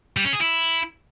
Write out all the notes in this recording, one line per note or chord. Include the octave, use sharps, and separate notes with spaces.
G3
C#4
G#4
E4